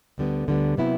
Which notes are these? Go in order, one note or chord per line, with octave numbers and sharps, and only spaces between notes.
D2 D3 G3 B3
D2 D3 G3 B3
C3 F#3 B3 E4